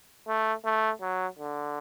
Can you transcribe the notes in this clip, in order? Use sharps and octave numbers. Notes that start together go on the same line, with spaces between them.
A3
A3
F#3
D3